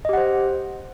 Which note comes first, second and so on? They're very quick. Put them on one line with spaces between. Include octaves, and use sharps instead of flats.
D#5 G4 F#5 C5